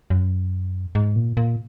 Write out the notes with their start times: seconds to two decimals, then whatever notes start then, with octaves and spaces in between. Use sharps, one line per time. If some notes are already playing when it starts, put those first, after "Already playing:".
0.10 F#2
0.95 G#2
1.16 A#2
1.37 A#2